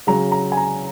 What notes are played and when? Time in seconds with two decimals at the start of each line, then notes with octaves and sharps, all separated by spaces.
0.07 C#3 F#3 A#5
0.32 A#5
0.52 G#5
0.57 A#5